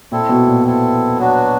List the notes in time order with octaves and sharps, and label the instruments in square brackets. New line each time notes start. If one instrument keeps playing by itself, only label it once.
[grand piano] A#2 [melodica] C4 E4 A4
[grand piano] B2
A#2
[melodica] C4 E4 A4
F#3 B3 D4 F#4